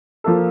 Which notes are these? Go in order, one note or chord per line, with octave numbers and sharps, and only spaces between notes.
F3 A#3 F4 A4